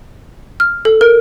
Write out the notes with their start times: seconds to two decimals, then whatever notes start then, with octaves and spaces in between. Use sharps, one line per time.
0.60 F6
0.85 A4
1.01 A#4